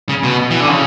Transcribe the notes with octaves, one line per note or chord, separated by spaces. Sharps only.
C#3
B2
E3
D3
C#3